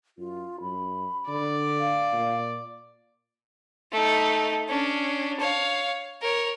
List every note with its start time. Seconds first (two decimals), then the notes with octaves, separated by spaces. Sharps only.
0.18 F#2 F4
0.61 F#2 B5
1.29 D3 D5
1.80 F5
2.13 A#2
3.92 A3 D#4
4.68 C#4 D4
5.40 C#5 F5
6.21 A#4 C#5